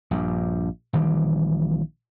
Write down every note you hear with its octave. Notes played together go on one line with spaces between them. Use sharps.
A#1 G2
A#1 D#3 E3 G3